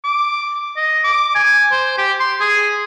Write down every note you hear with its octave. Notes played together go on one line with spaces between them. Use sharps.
D6
D#5
D6
G#5
C5
G4
C6
G#4